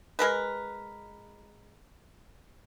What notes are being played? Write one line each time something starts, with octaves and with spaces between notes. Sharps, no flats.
G#3 A#4 B4